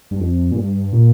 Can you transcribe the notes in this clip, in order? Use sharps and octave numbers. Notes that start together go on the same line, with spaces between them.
G2
F2
A#2
G2
A#2